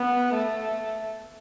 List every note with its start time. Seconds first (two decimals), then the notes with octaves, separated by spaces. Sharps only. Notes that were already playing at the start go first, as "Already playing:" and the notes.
Already playing: B3
0.34 A3